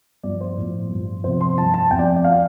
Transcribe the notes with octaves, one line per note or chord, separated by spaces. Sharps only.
G2 F3 D5
C5
A2 F3
G2 F3
F2 C3 F3 C5
C6
G2 F3 A5
A5
F2 F3 G5
D5
D5
F3 F5